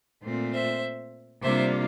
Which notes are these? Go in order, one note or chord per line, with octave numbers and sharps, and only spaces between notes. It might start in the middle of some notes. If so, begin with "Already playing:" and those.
A#2 A3 C4 F4
C5 E5
C3 G3 A#3 D4 F4 C5 E5